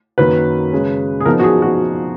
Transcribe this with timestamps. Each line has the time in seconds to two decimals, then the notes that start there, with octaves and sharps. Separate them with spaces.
0.18 F#2 D#3 F#3 A#3 B4
0.72 C#3 G#3 C#4
1.20 G#4
1.25 F3 B3 D#4 A#4
1.39 F#4
1.43 G#4
1.62 F#4